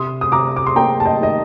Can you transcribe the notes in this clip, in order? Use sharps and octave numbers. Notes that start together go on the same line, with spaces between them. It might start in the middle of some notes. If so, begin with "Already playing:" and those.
Already playing: C3 C6 D#6
D#6
C3 A#5 D6
D6
C6
A#3 G5 A#5
A5
D#5 G5
D#3 D#5